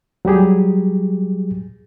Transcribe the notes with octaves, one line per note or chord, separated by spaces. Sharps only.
F#3 G3 G4 G#4